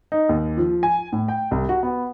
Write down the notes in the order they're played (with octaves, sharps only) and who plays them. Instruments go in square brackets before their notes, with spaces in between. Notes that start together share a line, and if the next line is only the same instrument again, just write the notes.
[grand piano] D#4
D#2
F3
G#5
A2
G5
C2
F#4
B3